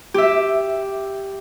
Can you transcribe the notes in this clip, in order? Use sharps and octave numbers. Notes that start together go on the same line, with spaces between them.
G4 E5